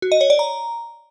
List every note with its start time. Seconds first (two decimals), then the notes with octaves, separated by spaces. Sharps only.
0.02 F#4
0.12 D#5
0.21 C#5
0.30 D5
0.39 A#5